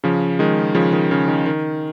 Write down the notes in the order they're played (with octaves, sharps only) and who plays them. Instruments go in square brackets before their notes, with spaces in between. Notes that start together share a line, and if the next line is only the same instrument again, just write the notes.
[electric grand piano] C#3 F3
D#3 G#3
C#3 F3
D#3
C#3
D#3
D#3